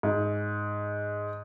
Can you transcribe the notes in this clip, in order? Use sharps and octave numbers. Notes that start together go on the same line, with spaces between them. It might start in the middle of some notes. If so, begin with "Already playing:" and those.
G#2